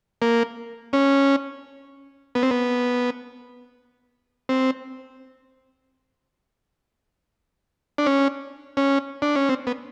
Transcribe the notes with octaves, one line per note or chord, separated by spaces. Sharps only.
A#3
C#4
B3
C4
B3
C4
D4
C#4
C#4
D4
C#4
C4
B3